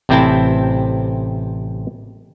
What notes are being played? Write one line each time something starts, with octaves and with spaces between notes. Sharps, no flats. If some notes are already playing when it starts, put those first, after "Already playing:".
A1 C3 C4 E4 G5 A5